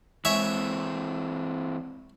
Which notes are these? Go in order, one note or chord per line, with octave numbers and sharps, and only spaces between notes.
E3 G#3 C4 C#5 E5